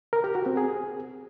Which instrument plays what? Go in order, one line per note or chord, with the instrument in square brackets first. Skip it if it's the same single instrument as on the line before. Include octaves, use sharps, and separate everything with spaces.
[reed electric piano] A#4
G4
F#4
C4
G#4